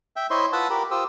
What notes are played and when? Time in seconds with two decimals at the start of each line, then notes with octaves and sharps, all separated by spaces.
0.16 E5 G5
0.31 E4 C5 C#5 D#5 E5 C6
0.53 F4 B4 F#5 A5 B5 E6
0.70 G4 A#4 B5
0.91 F4 G4 C5 D#6 E6